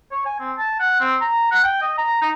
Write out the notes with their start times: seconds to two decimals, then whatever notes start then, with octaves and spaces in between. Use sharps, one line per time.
0.11 C#5
0.26 G#5
0.40 C4
0.58 A5
0.79 F#5
1.00 C4
1.21 A#5
1.51 F#5
1.64 G5
1.81 D#5
1.98 A#5
2.22 D#4